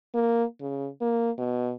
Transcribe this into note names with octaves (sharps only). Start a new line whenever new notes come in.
A#3
C#3
A#3
B2